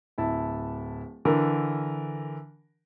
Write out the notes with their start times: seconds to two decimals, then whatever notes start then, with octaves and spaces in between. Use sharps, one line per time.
0.18 D1 E4 A5
1.25 D3 E3 A#4